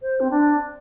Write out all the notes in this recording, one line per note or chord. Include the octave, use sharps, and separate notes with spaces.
C5
C4
D4